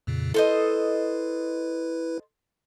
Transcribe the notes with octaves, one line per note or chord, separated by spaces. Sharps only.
F2 A#2 C#3
E4 A4 B4 C5 D#5